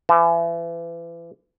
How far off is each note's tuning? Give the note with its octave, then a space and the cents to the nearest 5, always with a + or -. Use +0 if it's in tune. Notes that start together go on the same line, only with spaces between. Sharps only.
E3 +35 A5 -5